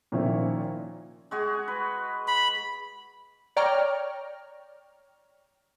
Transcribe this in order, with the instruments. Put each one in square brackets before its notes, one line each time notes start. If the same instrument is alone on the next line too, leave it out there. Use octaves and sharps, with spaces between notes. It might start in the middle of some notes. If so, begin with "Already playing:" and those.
[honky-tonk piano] A#2 D#3 F3 C#4 E4
[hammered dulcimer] G#3 F#4 G#4
B4
[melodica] B5
[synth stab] C#5 D5 G5 A#5 C#6 F6